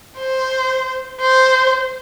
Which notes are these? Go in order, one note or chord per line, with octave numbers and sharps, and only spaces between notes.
C5
C5